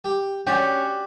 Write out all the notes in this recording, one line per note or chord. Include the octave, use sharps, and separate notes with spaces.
G4
C#4 F#4 G4 D5